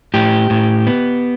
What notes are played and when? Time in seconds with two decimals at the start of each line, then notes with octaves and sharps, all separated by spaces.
0.14 A2 G4
0.50 A2
0.87 B3